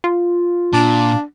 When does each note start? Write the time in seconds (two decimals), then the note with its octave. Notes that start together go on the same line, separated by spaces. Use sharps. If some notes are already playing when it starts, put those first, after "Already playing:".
0.04 F4
0.73 A#2 D4